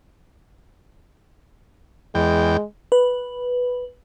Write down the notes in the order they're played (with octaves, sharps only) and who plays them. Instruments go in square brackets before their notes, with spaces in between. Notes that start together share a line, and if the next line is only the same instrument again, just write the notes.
[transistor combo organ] E2 G5 [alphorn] G#3
[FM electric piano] B4